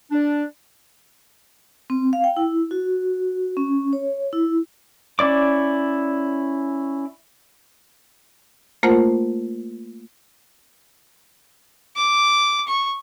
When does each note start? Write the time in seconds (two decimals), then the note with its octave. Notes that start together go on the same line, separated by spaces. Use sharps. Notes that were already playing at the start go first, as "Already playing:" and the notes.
0.12 D4
1.90 C4
2.13 F5
2.24 G5
2.37 E4
2.71 F#4
3.57 C#4
3.93 C#5
4.33 E4
5.19 C#4 E4 D5 D6
8.83 A3 A#3 F4 A#4 C5 F#5
11.96 D6
12.68 C#6